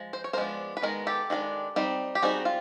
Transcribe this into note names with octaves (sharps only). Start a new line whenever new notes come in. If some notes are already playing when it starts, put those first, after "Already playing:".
Already playing: F3 G#3
C5
C#5
A#4 C5
F3 G#3 B3 D4
B4
D#3 G#3 B3 A#4
G4 A4
D#3 G#3 B3 D4
G3 C4 D#4
G4
G3 C4 D#4 F#4 G#4
F4